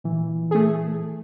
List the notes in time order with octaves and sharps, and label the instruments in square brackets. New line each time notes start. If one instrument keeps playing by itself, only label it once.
[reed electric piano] A#2 E3
[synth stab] A3 G#4